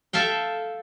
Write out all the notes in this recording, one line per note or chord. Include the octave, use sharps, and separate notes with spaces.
A4 E5 F5 G5